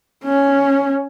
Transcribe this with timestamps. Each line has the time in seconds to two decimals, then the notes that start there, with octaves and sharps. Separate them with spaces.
0.24 C#4